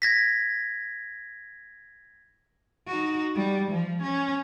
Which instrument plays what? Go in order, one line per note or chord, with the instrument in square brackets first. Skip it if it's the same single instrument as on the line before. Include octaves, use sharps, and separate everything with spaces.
[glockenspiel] G#6 A#6 B6
[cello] D#4 F#4
G3
F3
C#4